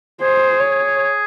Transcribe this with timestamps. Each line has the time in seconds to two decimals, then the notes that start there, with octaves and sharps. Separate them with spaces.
0.21 G#4 C5
0.60 C#5